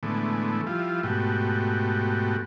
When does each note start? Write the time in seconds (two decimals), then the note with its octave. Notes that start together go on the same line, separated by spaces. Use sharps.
0.03 A2 D3 E3 G#3 A3 B3
0.67 F3 G3 E4 F4
1.03 G#2 B2 A3 F#4 G4